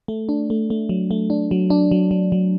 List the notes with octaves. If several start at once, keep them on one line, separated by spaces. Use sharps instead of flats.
A3
D4
A3
A3
F#3
A3
D4
F#3
D4
F#3
F#3
F#3